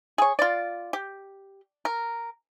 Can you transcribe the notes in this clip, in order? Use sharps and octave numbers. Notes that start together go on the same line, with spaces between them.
G#4 C#5
F4 D5
G4
A#4